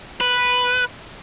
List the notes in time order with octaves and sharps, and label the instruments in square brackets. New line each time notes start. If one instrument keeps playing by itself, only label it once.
[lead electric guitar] B4